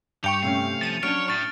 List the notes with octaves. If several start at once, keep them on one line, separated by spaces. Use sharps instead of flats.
G2 G4 G5 C#6 C#7 F7
C3 A3 C#4 F5
F3 A6 D#7
F#3 C#4 D4 C#5 F6 D7
A2 C#6 F6 A6